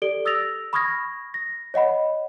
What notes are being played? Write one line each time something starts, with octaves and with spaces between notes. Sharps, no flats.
G4 A4 D5 D7 G7
D#6 E6 A6 A#6 F7
B5 C#6 D#6 F6 G#6 A#6
A#6
C#5 D#5 F#5 B5